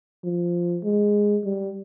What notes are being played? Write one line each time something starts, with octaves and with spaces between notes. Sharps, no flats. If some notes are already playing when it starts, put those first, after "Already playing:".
F3
G#3
G3